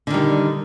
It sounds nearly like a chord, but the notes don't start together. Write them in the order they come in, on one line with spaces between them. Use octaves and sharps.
D3 D#3 G3